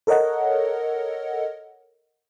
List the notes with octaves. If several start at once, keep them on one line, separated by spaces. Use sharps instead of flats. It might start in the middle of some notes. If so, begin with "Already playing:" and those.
A4 A#4 C#5 D#5 F#5